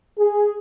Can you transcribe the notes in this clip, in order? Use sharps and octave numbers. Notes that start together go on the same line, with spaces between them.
G#4